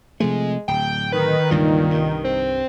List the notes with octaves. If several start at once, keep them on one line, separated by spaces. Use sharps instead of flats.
C3 F3 G#3 A3
D1 G5
D#3 B4
C#2 G2 A#2 E3
C2 G2
C4